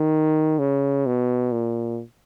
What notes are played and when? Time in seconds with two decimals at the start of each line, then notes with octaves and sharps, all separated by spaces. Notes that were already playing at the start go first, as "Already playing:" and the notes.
Already playing: D#3
0.59 C#3
1.06 B2
1.52 A#2